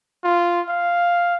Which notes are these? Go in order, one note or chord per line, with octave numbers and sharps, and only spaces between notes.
F4
F5